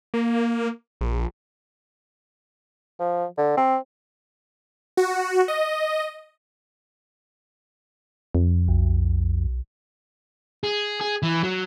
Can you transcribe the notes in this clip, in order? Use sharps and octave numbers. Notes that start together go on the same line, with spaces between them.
A#3
A#1
F3
D3
C4
F#4
D#5
F2
B1
G#4
G#4
E3
F#3